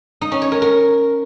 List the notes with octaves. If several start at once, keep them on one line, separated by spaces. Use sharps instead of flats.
D#4
C#4
C#5
A#4
A#4